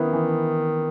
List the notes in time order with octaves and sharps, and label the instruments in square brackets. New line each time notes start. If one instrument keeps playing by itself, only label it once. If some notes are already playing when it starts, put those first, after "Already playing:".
Already playing: [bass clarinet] D#3 [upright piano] B3 E4
[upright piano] E3